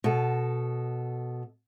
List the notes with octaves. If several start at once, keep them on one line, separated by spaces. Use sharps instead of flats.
B2 A4